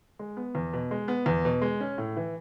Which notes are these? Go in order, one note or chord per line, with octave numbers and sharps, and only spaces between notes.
G#3
B3
E2
B2
G#3
B3
E2
B2
G#3
C#4
A2
E3